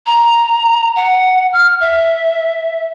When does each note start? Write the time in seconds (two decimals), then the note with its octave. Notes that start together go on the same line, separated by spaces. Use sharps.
0.07 A#5
0.96 F#5
1.53 F6
1.80 E5